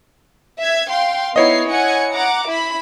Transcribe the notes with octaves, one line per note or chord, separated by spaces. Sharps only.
E5 G#6
F5 G5 C6
B3 D#4 E4 C#5 D#5 C7
F#5 G#5 C#7
F#5 A#5 D6
E4 B5